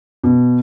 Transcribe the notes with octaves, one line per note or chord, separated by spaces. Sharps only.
B2